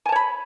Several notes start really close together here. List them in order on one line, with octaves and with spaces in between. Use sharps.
G#5 A5 C#5 B5